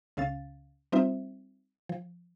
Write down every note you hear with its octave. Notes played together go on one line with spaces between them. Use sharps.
C#2 C#3 C#4 F5 A6
G3 C4 D#4 F4 C5 E5
F3